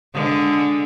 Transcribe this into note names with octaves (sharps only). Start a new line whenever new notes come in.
D3 G#3